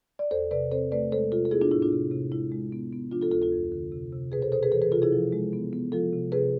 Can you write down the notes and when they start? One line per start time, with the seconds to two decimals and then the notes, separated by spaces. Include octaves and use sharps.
0.19 D5
0.31 E2 A4 C5
0.51 C3 B4 D5
0.72 C4 A4 C5
0.92 A3 B4 D5
1.12 G#3 A4 C5
1.31 C3 F4 A4
1.45 A4
1.51 B3 E4 G#4
1.61 D4 F4
1.71 A2 E4
1.82 D4 F4
1.92 C3
2.11 C3
2.31 G#3 E4
2.52 G#3
2.73 B3
2.93 B3
3.11 F3 D4 F4
3.22 F4 A4
3.32 D2 F4 A4
3.42 F4 A4
3.52 F2
3.72 D3
3.92 C3
4.13 C3
4.32 B2 G#4 B4
4.42 A4 C5
4.52 B2 A4 C5
4.63 G#4 B4
4.72 E3 A4 C5
4.82 G#4 B4
4.92 C3 F4 A4
5.02 E4 G#4
5.12 F3
5.33 G#3
5.53 B3
5.73 B3
5.92 F3 F4 A4
6.13 C3
6.32 C3 G#4 B4